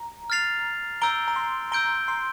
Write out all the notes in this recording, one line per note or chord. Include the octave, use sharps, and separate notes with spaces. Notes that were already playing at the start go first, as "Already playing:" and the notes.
Already playing: A#5
F6 A6 C7 F7
A#5 E6 G6 D7 G7
A#5
C6
A#5 E6 G6 D7 G7
C6